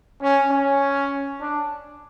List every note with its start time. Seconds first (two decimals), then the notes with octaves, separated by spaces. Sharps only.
0.21 C#4
0.51 C#4
1.41 D4